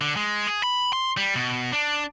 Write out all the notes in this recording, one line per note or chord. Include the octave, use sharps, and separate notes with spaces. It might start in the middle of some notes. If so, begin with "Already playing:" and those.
D3
G#3
G#4
B5
C6
G3
B2
D4